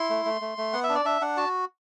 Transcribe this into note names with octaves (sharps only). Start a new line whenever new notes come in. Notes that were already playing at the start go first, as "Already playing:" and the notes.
Already playing: E4 C6
A3
A3
A3
A3
B3 F#5
E5
D4
D5
D4 E5
D4 F#5
F#4 A5